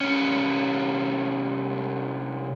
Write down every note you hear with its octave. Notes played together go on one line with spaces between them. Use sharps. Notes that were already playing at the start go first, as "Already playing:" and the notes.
C2 C#4